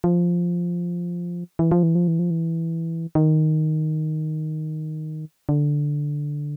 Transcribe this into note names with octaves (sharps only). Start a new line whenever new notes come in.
F3
E3
F3
E3
F3
E3
F3
E3
D#3
D3